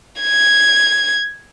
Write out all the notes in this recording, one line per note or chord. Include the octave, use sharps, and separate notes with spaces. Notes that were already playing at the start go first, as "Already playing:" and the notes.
G#6